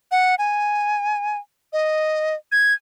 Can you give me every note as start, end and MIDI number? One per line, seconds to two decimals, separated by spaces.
0.12 0.35 78
0.39 1.38 80
1.73 2.35 75
2.52 2.73 92